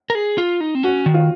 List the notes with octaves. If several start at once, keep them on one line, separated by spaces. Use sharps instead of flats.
A#4
G#4
F4
D#4
C4
C#4 F#4
D#3
F4